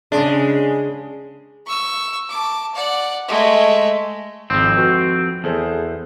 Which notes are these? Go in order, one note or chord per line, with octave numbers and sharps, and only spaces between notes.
C#3 G#3 D4
C#6 E6
A5 D6
D5 F#5
G#3 A3
G#1 F2 C4
F#4 B4
E2 G#4 A4 C5